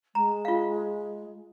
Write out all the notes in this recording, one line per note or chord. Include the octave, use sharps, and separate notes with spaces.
G#3 A#5
F4 F5